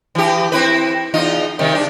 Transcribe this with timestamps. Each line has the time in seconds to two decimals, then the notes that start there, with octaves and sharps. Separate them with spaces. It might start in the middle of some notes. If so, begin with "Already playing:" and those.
0.15 E3 G4
0.52 C4 E4 B4
1.14 E2 D#4 F4
1.59 C3 D#3 G3
1.75 D4